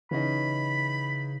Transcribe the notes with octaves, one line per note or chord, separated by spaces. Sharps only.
C#3 E3 C#4 D#4 B5